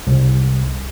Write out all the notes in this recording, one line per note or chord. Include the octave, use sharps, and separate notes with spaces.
C2